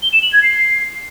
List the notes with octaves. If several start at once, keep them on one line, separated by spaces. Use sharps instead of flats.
G7
E7
F#7
G#6
C7